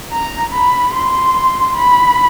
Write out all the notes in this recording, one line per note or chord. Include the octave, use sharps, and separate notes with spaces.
A#5
B5
C6
B5